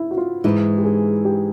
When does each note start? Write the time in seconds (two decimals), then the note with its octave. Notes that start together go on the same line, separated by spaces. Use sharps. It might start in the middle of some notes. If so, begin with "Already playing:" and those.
Already playing: E4
0.11 F#4
0.17 F4
0.44 G#2 E3 G#3 E4
0.78 G4
0.84 G#4
1.25 G4